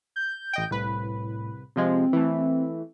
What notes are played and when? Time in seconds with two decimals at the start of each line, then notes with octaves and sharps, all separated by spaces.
0.16 G6
0.53 A1 D#5 G5
0.71 C2 A2 B4
1.76 C3 F3 G#3 C4
2.13 E3 A3